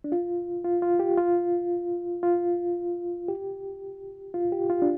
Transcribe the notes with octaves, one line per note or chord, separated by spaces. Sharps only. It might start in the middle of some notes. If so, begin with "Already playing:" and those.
D4
F4
F4
F4
G4
F4
F4
G4
F4
G4
F4
D4